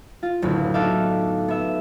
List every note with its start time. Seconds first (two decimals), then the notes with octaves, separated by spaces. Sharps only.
0.23 F4
0.42 F#1 D2 A2 B3
0.74 D#4 F#4 A4 E5 F5 D6
1.48 B3 E5